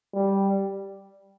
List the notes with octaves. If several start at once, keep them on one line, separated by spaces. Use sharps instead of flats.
G3